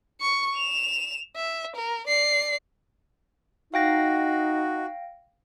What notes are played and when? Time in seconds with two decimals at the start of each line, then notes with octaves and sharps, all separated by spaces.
0.21 C#6 C#7
0.55 E7 F7
1.36 E5
1.76 A#4
2.08 D5 C7
3.74 D#4 F#4 F5 G5 A#6